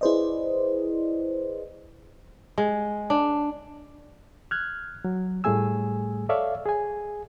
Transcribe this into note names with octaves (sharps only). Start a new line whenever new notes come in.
E4 G#4 B4 C5 D5 D#5
G#3
D4
F6 F#6 G#6
F#3
A2 G3 A3 G#4 G#5 E6
A4 C#5 D5 E5 F5
G#4 G#5